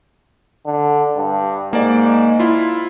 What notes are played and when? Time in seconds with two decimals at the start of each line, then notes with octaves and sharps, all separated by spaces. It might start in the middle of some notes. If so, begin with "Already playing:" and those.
0.66 D3
1.16 G2
1.73 G#2 A#3 D5
2.39 E4 F4